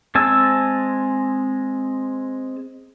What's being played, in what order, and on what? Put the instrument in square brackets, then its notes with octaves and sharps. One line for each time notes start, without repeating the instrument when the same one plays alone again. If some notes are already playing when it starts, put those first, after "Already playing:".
[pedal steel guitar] G#3 C4 G#5 A5 E6